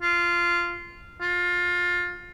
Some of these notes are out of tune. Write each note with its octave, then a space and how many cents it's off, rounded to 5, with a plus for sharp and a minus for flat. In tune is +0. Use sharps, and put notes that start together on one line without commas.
F4 -10
F4 +20